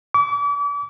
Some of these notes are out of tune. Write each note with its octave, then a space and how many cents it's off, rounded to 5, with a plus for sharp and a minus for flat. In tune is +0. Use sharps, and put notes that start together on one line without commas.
D6 -40